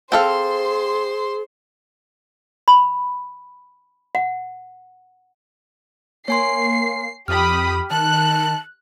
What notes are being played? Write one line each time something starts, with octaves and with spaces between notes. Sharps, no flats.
C4 G#4 A4 C5 F5 C6
B5
F#5
A#3 C#5 G#5 C6 C7
F2 G4 B5 D#6 F6
D#3 A5 F#6